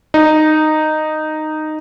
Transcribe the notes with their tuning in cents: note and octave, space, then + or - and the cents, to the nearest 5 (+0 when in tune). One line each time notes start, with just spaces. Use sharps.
D#4 -10